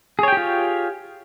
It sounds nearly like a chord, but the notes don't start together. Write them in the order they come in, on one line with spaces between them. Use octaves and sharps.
G#4 C#5 G5 G4 F4